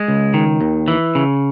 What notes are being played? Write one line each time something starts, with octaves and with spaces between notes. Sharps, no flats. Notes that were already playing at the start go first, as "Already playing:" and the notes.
Already playing: G#3
C#2
D#3
D#2
E3
C#3